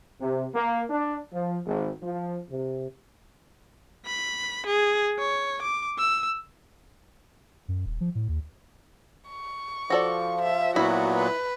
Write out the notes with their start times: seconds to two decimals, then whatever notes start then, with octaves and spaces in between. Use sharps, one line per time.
0.21 C3
0.54 A#3
0.90 D4
1.32 F3
1.66 G#1
2.02 F3
2.50 C3
4.06 B5
4.67 G#4
5.19 C#5
5.63 D6
5.98 E6
7.68 F#2
7.86 D#1
8.01 F3
8.15 A2
8.29 D#2
9.30 C#6
9.90 F3 F#4 A4 D5
10.42 E5
10.76 A#2 F#3 B3 E4 F#4 B5
11.16 B4